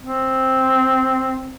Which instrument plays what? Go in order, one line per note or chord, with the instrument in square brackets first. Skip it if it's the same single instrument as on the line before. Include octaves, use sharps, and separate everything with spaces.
[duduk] C4